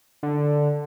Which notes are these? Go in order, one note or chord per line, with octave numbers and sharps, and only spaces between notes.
D3